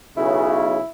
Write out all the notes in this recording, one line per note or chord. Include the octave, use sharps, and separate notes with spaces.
B1 C#3 E4